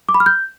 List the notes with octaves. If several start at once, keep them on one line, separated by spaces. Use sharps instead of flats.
D6
B5
F6
G6